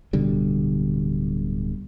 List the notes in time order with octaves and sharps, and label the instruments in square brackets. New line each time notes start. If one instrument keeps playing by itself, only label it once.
[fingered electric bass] D1 B2 D3 G3